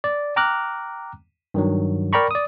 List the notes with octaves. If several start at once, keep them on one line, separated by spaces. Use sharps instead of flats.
D5
G5 A#5 D6 F6 F#6
G2 D#3 F#3
A#4 D5 G5 A#5 B5 C#6
D5 D#6